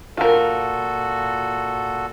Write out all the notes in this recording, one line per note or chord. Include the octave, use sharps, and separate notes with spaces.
A#2 F4 F#4 A4 A#4